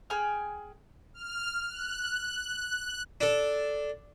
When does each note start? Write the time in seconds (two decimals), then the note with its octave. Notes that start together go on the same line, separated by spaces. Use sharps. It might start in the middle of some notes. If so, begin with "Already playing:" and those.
0.10 G#4 G5 G#5 F6
1.14 F6
1.69 F#6
3.21 D4 A4